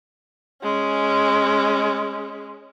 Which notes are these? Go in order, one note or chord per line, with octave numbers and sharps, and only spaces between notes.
G#3 C#4